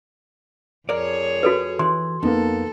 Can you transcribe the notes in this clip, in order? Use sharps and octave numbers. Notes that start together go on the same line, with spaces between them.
F2 G#4 A#4 C#5 D5
F#4 A4 B4
E3 C6
F2 A#3 B3 D#4 A4